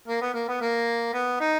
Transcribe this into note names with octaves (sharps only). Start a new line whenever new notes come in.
A#3
B3
A#3
B3
A#3
B3
D#4